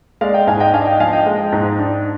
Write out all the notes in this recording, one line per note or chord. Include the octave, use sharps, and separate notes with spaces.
G#3 D5 F5
D#5 G5
G#2 F5 G#5
D#5 G5
D4 F5 G#5
D#5 G5
F3 F5 G#5
D#5 G5
G#3
G#2
D4